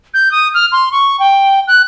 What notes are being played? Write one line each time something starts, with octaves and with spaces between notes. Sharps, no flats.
G6
D#6
F6
C6
C#6
G5
F#6